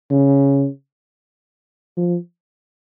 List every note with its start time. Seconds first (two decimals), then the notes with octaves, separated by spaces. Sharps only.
0.11 C#3
1.97 F3